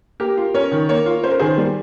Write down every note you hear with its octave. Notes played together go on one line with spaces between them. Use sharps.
A#3 G4 A#4
F4
C#4 A#4 C#5
D#3
A#3 A#4 C#5
F4
C#4 C5
A#4
D#3 G#4 C5
G3